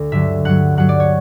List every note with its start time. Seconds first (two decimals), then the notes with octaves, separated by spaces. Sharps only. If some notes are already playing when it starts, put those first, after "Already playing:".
Already playing: D2
0.12 G2 D3 F#3 E5
0.45 G2 F#3 F#5
0.77 G2 F#3 F#5
0.89 D5
1.00 C#5